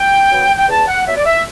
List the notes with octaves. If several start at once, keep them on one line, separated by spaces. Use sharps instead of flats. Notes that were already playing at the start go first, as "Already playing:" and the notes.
Already playing: G5
F#3 B3
G5
E2 A5
F#5
B2 F#3 B3 E5
D5
E5